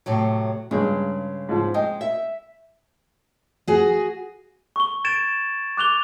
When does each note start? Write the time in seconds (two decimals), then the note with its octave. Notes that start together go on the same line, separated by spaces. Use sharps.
0.06 A2 C3 F#3
0.71 G2 C#3 G#3
1.49 G#2 F3
1.74 G#3 D#5 G5
2.01 E5
3.67 F#4 G#4
4.76 C#6 G7
5.05 G#6 A6 D7 E7
5.77 D6 F#6 F7 G7